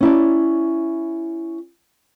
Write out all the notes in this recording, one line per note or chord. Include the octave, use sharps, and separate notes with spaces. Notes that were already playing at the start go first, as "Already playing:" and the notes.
C#4 E4 D5